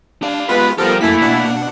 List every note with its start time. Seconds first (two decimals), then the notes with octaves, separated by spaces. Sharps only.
0.23 D4 G4 F5
0.49 G#3 B3 F4 B4
0.78 F3 G3 B3 F4 G4 A4 A#4
1.01 F#2 E3 A3 A#3 E4 A4 B6
1.21 B2 D4 F#5